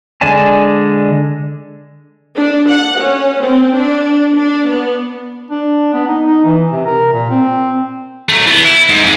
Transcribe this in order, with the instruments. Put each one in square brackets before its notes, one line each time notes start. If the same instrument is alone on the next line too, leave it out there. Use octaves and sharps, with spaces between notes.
[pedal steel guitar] D3 G#3 D5 G#5 A5
[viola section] D4
F#5
C#4
C4
D4
D4
B3
[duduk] D4
B3
D#4
D#4
E3
C3
A#4
A#2
C4
[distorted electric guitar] F#3 A3
E3 B3
E4
G#2
F2 G#3